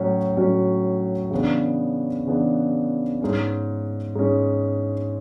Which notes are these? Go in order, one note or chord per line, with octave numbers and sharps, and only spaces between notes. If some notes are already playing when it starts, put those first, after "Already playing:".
Already playing: A2 F#3 C#4 F#4
A2 F#3 C#4 F#4
C#3 E3 B3 D4
C#3 E3 B3 D4
G#2 G#3 C#4
G#2 G#3 C#4